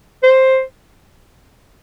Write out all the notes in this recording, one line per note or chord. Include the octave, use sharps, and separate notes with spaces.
C5